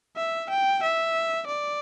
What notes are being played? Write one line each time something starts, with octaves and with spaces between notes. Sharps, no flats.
E5
G5
E5
D5